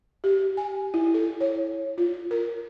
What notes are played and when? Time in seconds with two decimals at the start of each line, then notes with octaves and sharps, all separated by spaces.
0.24 G4
0.57 G#5
0.94 E4
1.14 A4
1.40 C#5
1.98 F4
2.31 A#4